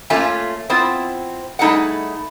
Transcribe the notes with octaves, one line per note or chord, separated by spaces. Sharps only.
A3 A#3 C#4 F4 E5 G#5
B3 C4 E4 F4
G3 A3 D#4 E4 G#4 F#5